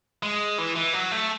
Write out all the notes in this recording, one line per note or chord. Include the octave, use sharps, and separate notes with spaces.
G#3
E3
E3
F#3
A3